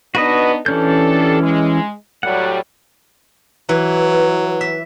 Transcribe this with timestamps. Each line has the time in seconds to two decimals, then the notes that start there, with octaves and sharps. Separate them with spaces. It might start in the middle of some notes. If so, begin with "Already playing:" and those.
0.15 B3 D4 D#4 F#4 B4 D#5
0.66 E3 C#4 D4 G4 A4 G6
1.41 G#3
2.23 A2 F#3 G3 F#5
3.69 E3 F#3
4.61 E5